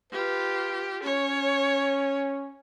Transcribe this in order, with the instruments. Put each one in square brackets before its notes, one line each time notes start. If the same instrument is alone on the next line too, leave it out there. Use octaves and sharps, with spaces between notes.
[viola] F4 G4 [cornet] B4
[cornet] C#4 [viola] C#5